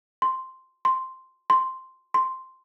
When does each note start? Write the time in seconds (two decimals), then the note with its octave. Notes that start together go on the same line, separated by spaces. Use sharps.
0.22 C6
0.85 C6
1.50 C6
2.14 C6